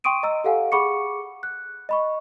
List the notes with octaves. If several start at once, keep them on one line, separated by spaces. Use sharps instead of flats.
G5 C6 C#6 D#6 D7 D#7
D#5 A#5 E6
G4 A4 F5 F#5 G#5
G#4 F#5 B5 C#6 D6 C#7
F#6
D#5 B5 C#6